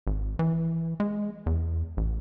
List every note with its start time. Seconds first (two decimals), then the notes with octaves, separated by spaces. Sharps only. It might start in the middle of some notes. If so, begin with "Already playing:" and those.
0.07 G#1
0.39 E3
1.00 G#3
1.46 E2
1.97 A1